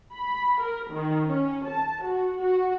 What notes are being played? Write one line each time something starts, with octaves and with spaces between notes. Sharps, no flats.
B5
A#4
D#3
C#4
A5
F#4
F#4